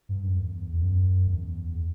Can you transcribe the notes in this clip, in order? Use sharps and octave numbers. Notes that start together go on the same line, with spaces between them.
G2
F#2
E2
E2
F#2
E2